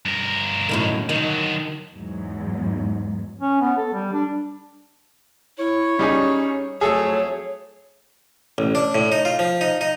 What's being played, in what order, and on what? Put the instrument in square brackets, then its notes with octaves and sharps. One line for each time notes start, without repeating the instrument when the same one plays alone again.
[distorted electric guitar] G2 A#4
[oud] F#2 A2 D#3
[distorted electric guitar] D3 F#3 [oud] D#3
[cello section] E2 G#2 F#3
[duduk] C#4
B3
A4
G3
D4
[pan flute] E4 [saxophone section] C#5
[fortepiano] G3 D#4 G#4 [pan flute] C#4
[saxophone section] F2 F#3 A3 [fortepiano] G#4 A4 [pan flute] C#5
[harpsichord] A1
D4
A2
D#4
F4
F3
D#4
D#4